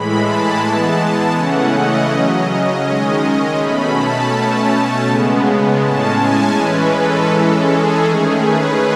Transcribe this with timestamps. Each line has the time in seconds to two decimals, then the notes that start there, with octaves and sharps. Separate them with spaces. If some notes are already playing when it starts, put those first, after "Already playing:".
Already playing: A2 E3 G#3 B5
0.23 A5
0.60 E3 G#3 B3 A5
1.35 C#3 E3 A3 C#4 F#5
1.73 D#5
2.09 C#3 F#3 C#4
2.47 D#5
2.85 D#3 G#3 C#4
3.21 D#5
3.58 B2 A3 C#4 B5
3.95 A5
4.32 B2 A3 C#4 A5
5.07 C#3 G#3 B3
5.81 A2 G#3 C#4 A5
6.18 G#5
6.55 E3 G#3 C#4 B4
6.92 A4
7.30 E3 G#3 C#4
7.67 G#4
8.04 D#3 A3 C#4
8.42 B4